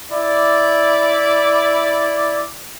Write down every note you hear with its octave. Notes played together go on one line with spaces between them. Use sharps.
E4 D5